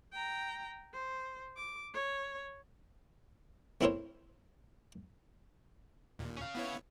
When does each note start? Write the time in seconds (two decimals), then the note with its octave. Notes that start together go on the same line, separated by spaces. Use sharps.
0.13 G5 A#5
0.94 C5
1.56 D6
1.94 C#5
3.81 A3 C4 E4 A#4 C5 C#5
6.19 D#2 A#2
6.37 C#4 F5
6.55 B3 E4 C#5